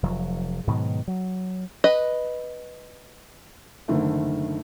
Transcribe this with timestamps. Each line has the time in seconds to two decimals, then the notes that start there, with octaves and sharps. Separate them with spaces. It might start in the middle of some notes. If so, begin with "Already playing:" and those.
0.03 F1 F3 F#3
0.67 G#2 B2 D#3 F#3
1.08 F#3
1.84 B4 D#5
3.88 F#1 D3 D#3 A3